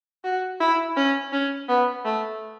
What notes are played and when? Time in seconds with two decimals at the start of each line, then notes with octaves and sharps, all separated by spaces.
0.24 F#4
0.60 E4
0.96 C#4
1.33 C#4
1.69 B3
2.05 A3